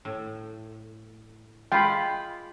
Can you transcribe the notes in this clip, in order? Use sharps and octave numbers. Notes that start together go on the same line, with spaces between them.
A2
G#3 F4 G5 B5